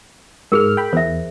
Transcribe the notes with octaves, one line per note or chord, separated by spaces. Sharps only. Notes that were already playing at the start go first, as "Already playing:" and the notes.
G#2 G#4 A#4 F6
G5 B5
E2 C5 E5